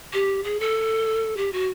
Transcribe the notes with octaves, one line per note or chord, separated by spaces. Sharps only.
G4
G#4
A4
G4
F#4